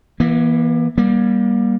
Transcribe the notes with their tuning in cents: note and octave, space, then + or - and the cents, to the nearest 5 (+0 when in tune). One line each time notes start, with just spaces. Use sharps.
E3 +0 A#3 +40
G3 +0 A#3 +30